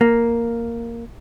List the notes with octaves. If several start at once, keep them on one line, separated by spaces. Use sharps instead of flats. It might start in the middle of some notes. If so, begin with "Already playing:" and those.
A#3